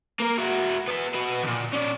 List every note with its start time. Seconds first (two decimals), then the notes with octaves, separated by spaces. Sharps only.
0.20 A#3 A#4
0.38 E4 F#4
0.88 B3 E5
1.14 F#4 B4
1.42 D#2 A#2
1.73 C#4 D5